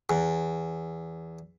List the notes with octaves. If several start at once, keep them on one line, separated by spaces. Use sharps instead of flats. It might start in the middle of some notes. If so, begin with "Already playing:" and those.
E2